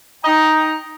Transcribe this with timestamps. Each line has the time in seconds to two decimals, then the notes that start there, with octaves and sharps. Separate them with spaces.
0.24 D#4 D#5 G5 A#5